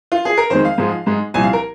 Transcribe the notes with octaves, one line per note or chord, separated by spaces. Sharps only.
F4
G#4
A#4
F2 D#3 G#3 C5
F5
G#2 F3 G#3
G#2 G#3
C2 A#2 F3 G#5
F5
A#4